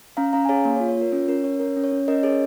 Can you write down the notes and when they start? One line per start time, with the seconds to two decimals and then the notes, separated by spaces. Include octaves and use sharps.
0.17 C#4 F5 A#5
0.33 C#4 F5 A#5
0.45 G#5
0.49 G#4 C#5 F5
0.65 A#3
0.76 C#5
0.80 F4
0.88 C#5
0.97 F4 A#4
1.12 C#4 C#5
1.28 C#4 A#4
1.44 C#4 C#5
1.60 C#4 A#4
1.76 C#4
1.84 C#5
1.92 C#4
2.08 C#4 A#4 D#5
2.23 G#4 C#5